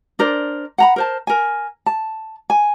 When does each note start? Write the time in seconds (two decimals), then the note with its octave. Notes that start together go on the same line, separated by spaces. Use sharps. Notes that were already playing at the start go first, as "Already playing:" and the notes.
0.19 D4 A#4 C5 D5
0.78 F#5 A#5 B5
0.96 A#4 C5 A5
1.27 A#4 G#5
1.86 A5
2.50 G#5